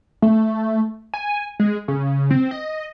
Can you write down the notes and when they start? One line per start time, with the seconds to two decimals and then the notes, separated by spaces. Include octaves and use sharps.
0.22 A3
1.14 G#5
1.60 G#3
1.88 C#3
2.31 C4
2.51 D#5